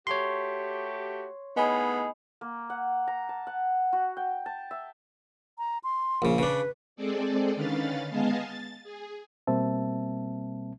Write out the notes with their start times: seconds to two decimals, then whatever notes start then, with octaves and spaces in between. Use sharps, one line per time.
0.07 A3 F#4 G4 C#5 C6
1.57 A2 B3 D#4 G#4 D#5 G#5 B5
2.41 A#3
2.70 F#5
3.07 A#5
3.29 A5
3.47 F#5
3.93 F#4
4.17 G5
4.46 A5
4.71 E5
5.58 A#5
5.84 C6
6.22 A#1 C#3
6.38 C#3 D4 B4
6.96 G#3 C4 G#4 A4 D5
7.55 D3 D#3 C#4 B4 F5 A6
8.10 G#3 B3 D#5 F5 G#5 A5
8.44 A6
8.83 G#4
9.47 B2 G3 A#3 C4 E5 A5